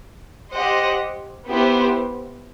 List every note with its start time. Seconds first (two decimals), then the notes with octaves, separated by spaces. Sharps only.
0.53 G4 C5 D#5 F#5
1.48 B3 E4 G4 C5